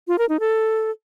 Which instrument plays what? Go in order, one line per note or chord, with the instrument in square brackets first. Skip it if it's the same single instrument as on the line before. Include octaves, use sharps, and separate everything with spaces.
[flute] F4
A#4
D#4
A4